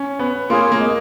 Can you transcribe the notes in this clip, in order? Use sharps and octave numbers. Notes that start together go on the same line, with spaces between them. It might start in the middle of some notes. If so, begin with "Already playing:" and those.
Already playing: C#4
B3
A#3 F4 G#4 C#5
A#3
G#3